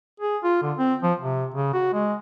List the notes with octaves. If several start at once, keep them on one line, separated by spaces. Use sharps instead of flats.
G#4
F4
D3
C4
F3
C3
C#3
F#4
G#3